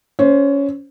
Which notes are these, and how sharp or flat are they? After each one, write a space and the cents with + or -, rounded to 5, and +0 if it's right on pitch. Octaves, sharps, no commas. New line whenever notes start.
C#4 +15 C5 +0